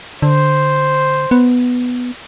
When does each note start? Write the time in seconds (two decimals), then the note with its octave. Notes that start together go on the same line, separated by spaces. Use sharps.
0.22 D3 C5
1.31 B3